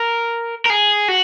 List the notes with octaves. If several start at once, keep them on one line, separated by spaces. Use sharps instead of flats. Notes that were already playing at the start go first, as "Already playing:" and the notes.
Already playing: A#4
A#4
G#4
F#4